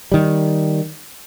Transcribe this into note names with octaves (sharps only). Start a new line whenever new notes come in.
D#3 G3